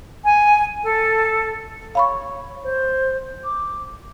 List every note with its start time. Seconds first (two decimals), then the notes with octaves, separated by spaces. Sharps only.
0.24 G#5
0.83 A4
1.95 C#5 F5 B5 C#6
2.64 C5
3.44 D6